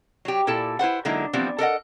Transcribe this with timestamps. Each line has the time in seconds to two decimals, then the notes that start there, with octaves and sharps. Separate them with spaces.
0.25 F#3 G4
0.47 A#2 E4 A4 A5
0.79 E4 B4 C5 F#5
1.05 D3 F#3 G#3 A#3 D#4 E4
1.33 E3 F3 G3 B3 C4
1.58 A4 A#4 D#5 F#5